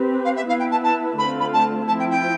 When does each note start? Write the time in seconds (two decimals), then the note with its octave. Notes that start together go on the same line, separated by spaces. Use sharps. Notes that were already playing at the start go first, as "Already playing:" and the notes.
Already playing: C4 G4 B4
0.24 F5
0.36 E5
0.48 B3 E4 B4 F5
0.59 G5
0.71 A5
0.83 A5
1.17 D3 A3 C4 F4 B5
1.40 B5
1.53 A5
1.87 F3 C4 E4 A5
1.99 G5
2.10 G5